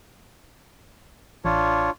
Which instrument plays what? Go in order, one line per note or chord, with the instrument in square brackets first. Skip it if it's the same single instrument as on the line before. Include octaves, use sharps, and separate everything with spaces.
[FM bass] A1 [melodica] D4 F4 C#5